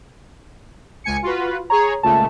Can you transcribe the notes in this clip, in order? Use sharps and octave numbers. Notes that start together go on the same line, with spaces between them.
C#2 G#5 C#7
F4 F#4 B4
G#4 C#5 A#5
C#2 A#2 A3 A5